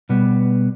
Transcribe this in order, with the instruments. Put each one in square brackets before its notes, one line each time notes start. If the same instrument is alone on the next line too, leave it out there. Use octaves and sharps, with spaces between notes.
[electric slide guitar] B2 G3 B3